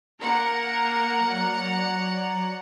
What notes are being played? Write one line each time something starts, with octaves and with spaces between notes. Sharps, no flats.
A#3 A#4 F#5 A#5 C#7
F#3 C#5 D5